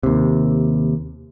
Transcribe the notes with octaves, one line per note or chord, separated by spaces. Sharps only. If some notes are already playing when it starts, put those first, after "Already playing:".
D#2 C3